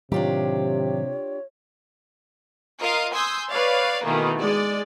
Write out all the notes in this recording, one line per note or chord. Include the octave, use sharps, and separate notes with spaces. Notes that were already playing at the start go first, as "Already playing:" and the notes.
A2 C3 D#3 F#3 D4 F4 G4 C#5
F4 A#4 D#5 F5
G#5 C6 D#6 E6 G6
B4 C#5 D5 F5
B2 D#3 E3 A3 A#3
G#3 D5